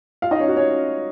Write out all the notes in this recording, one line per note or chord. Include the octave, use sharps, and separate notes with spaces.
F4 F5
D#4 D#5
C#4 C#5
F#4
C#4 C#5